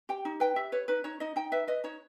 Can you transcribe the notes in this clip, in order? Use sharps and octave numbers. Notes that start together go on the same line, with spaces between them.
G4 G5
D#4
B4 G5
G4 E5
B4 C#5
D#4 B4
D#4 C#5
D#4 D#5
D#4 G5
B4 E5
B4 D#5
D#4 C#5